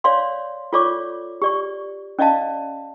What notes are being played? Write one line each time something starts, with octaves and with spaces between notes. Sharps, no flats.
C#5 D5 F5 C6
F4 A4 C#5 D5 C#6 D6
G4 D5 C#6
C#4 D5 D#5 F5 A5